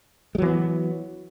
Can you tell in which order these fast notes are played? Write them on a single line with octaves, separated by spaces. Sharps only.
G#3 F#3 E3 B3